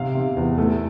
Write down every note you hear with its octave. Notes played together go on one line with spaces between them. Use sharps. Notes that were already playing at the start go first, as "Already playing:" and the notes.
Already playing: C3 F5
C3
E2
A3